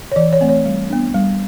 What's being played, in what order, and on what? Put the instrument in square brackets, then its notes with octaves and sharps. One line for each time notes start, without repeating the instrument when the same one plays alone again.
[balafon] C#5
E3 D5
C#5
A3 C4
C#5
G3
B3 D4
G3